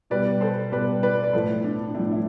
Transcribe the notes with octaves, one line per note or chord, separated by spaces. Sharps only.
B2 G3 B4 D5
A4 C5
B2 G3 B4 D5
B4 D5
D5
A2 F3 A4 C5
D4
A2 F3 D4
E4